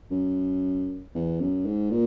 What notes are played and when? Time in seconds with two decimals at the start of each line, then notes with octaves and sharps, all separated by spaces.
0.11 F#2
1.15 E2
1.41 F#2
1.66 G#2
1.91 A#2